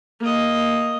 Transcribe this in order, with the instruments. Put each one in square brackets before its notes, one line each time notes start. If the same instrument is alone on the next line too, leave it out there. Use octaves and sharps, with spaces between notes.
[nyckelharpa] A#3 D#5